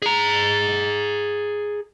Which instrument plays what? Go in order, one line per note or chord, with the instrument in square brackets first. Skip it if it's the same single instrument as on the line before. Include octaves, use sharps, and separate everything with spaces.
[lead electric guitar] G#4 A#5